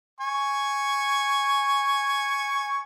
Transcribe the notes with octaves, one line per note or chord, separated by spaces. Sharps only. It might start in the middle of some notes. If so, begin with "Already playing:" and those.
G#5 C#6